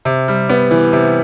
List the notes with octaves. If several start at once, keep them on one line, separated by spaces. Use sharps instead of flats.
C3
G3
B3
E3
C3